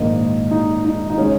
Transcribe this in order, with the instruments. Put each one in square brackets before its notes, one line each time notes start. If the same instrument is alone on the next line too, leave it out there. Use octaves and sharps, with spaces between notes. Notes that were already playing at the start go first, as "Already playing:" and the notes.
Already playing: [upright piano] A#1 G#2 D#3 A#3 D#5
D#4
D#4
D#4
C#3 G#3 C#4